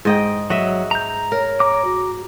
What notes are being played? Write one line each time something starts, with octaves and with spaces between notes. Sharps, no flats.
G#2 D#5 G5
F#3 D#5 E5
A#5 G6
A#4 C#5
A#5 D6
F#4